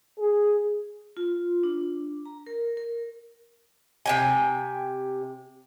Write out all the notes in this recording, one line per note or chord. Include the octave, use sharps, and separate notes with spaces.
G#4
F4
D4
A#5
A#4
A#4
C3 G5 G#5